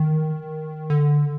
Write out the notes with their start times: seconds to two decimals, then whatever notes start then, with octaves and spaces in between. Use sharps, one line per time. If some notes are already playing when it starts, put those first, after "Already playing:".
Already playing: D#3
0.90 D3